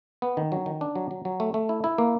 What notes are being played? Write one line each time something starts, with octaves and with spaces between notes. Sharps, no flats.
B3
D#3
F#3
D#3
D4
F#3
F#3
F#3
A3
A3
E4
E4
A#3